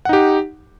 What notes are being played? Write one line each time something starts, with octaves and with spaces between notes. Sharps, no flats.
D#4 G4 F#5